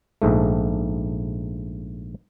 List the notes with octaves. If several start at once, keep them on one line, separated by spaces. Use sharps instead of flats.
A#1 G#2 A3